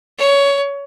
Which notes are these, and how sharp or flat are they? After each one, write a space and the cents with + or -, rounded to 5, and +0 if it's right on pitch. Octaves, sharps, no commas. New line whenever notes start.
C#5 +15